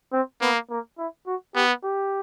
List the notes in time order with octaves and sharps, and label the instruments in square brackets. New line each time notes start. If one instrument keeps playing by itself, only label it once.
[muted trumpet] C4
[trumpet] A#3 [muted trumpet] B3
[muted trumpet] A#3
E4
F#4
[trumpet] B3 [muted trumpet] G4
[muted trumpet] G4